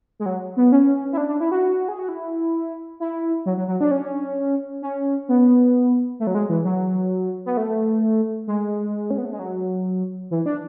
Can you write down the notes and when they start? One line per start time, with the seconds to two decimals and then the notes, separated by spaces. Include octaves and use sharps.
0.20 G#3
0.26 F#3
0.57 B3
0.72 C#4
1.13 E4
1.17 D4
1.28 D4
1.41 E4
1.51 F#4
1.88 G#4
1.99 F#4
2.09 E4
3.00 E4
3.46 F#3
3.57 F#3
3.68 F#3
3.81 D4
3.91 C#4
4.82 C#4
5.29 B3
6.20 A3
6.27 F#3
6.35 G#3
6.50 E3
6.65 F#3
7.46 B3
7.57 A3
8.47 G#3
9.11 C#4
9.18 B3
9.25 A3
9.33 G#3
9.39 F#3
10.31 E3
10.46 D4